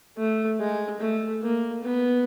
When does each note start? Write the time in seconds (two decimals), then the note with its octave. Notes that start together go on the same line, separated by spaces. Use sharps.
0.18 A3
0.60 G#3
1.00 A3
1.42 A#3
1.83 B3